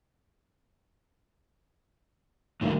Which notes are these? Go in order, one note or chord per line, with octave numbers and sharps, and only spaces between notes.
C2 A2 D3 D#3 F#3 A#3